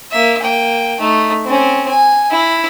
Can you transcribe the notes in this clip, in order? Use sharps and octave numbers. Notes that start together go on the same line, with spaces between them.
A#3 E5
A#3 G5
A3 D#4
C4 C#4
G#5
E4